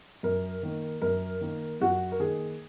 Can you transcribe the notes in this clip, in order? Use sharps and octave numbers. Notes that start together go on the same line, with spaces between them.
F#2 A#4
D#3 A#3
F#2 A#4
D#3 A#3
F#2 F#4
A#4
D#3 A#3 G#4